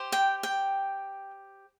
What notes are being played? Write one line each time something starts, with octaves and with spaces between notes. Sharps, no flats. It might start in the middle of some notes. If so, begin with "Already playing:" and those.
Already playing: G4 C5
G5
G5